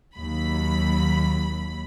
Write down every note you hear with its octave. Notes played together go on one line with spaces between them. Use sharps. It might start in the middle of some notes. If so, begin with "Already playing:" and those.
D#2 F#3 B5